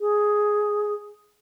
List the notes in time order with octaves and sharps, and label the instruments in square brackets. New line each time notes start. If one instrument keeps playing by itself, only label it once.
[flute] G#4